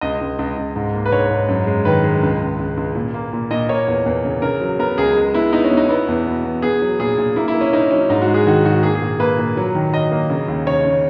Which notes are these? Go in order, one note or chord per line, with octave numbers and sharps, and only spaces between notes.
C#2 D#5
C#2
C#2
C#2
G#2
A#3
B4
G#2 C#5
G#2
F#2
G#3
D#3 B4
G#3
C#2
C#2
C#2
C#2
A#2
A#3
A#2
A#2 D#5
A#3 C#5
E2
E2
C#3
C#3 A#4
F#3
B3 A#4
C#2 G#4
G#3
B3 E4
B3 D#4
C#4
B2
D#4
B3 E4
E2
B2
B3
B3 G#4
F#3
A#2 G#4
A#2
A#3 E4
E4
A#3
C#4
A#3 D#4
F#3 C#4
G#2 D#4
F#4
G#3
G#4
D#3 F#4
G#2 F#4
A#3 G#4
G#4
A#2
A#3 B4
A#2
F#3
D#3
F#3 D#5
A#3
C#3
D#2
C#3 C#5
C#3